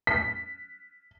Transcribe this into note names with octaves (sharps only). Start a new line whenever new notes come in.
B6